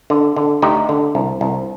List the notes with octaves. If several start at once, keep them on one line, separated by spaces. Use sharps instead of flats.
D3
D3
D2 D#4 G4
D3
C2
C2